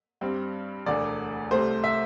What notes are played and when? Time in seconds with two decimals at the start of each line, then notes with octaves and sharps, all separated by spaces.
0.21 G2 G3 C4
0.86 E1 D2 D3 D5
1.51 C2 C3 A3 C5
1.84 E5